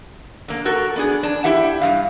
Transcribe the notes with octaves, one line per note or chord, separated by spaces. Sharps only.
D3 A#3
F#4 A4 A#4
B3 D4 G#4
D4
E4 G4 E5 F#5
G2 D#3 F5